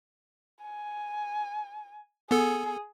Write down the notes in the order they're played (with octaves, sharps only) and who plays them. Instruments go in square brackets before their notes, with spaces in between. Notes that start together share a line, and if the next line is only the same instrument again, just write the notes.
[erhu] G#5
[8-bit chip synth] B3 A4 [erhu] G#4